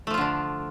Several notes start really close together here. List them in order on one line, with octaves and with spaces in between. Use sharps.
A3 F3 F4 D3 D4